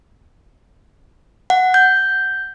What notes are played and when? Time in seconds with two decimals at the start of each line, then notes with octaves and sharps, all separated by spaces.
1.50 F#5
1.74 G6